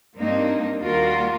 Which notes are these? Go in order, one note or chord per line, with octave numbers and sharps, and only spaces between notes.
G2 A#3 C4 D4 D#4
D#2 G3 A#3 F4 F#4 A#4